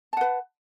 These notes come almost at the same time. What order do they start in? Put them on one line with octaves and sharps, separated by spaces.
A5 F#5 B4